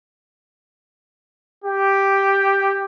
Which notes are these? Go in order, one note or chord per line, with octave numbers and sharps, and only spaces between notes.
G4